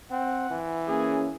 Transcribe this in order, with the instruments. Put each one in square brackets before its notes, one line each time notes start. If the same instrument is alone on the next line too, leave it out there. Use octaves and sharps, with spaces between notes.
[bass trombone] C4 [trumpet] F#5
[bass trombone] E3
[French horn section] A#3 C#4 [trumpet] G#4